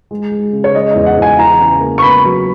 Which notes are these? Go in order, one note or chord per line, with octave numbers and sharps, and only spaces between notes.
G#3
G#3
C#3
C#5
G#3 D#5
E2 D#5
F#5
E2
G#5
E3 A#5
C#3
A#3
C#6
B3 B5
F#3